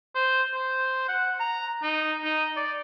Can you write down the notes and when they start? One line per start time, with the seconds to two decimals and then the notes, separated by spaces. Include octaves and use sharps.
0.15 C5
0.54 C5
1.08 F#5
1.40 A#5
1.83 D#4
2.24 D#4
2.57 D5